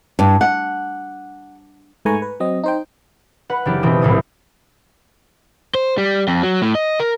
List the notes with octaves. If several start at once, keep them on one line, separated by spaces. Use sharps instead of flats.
G2
F#5
G#2 A3 B4 G#5 A#5 C#6
B4
F#3 C4 D#5
D#4 C5 G5
B4 F#5
F#1 E3 D4 G4
B2 E3 C4 D#6
D#1 C2 A2 D#6
C5
G3
F2
F#3
A2
D#5
A#4